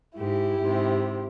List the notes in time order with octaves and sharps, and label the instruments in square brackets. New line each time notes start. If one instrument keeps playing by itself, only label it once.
[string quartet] G#2 [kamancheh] E4 G4
[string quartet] G#2 C3